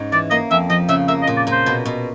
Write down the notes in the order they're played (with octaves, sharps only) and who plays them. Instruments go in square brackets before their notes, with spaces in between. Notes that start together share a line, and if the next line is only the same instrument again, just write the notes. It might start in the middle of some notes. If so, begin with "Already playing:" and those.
Already playing: [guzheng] G#2 G#3 C#4
[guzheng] E3 [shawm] D5
[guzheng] A#3 [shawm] D#5
[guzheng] F2 [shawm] E5
[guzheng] F3 [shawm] D#5
[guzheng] C#3 [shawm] E5
[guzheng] A#3 [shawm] E5
[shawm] D#5
[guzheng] A#2
[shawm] D5
[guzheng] A#2
[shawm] C5
[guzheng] B2
B2